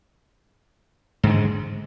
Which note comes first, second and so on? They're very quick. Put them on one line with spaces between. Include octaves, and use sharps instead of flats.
G#2 D3 G#3